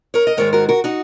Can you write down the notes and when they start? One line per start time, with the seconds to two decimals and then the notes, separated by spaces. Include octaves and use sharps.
0.14 A#4 C#5
0.27 D#5
0.37 G#2 D#3 G#3 A#4 C#5
0.53 F#4 A#4
0.69 F#4 A#4
0.84 D#4 F#4